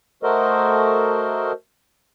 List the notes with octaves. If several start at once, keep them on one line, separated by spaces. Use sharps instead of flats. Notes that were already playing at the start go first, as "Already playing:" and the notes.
A3 F#4 A4 A#4 C5 D#5